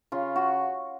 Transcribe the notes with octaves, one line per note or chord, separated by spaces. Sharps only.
C#3 F4
F#4